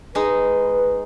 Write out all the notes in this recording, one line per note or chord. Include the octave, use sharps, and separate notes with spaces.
G#3 D#4 B4